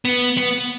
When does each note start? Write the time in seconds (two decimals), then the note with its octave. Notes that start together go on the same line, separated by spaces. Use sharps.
0.05 B3
0.37 B3